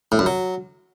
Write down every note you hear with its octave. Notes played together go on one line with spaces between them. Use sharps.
A2
F#2
F#3